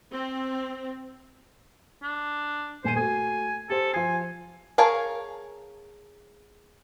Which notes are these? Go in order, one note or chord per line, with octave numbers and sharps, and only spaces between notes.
C4
D4
D#1 C5 G#5 D#7
A3 F#4 G#5
G4 A4 C5
F3 G#5 C7
G#4 A#4 C#5 F5 A5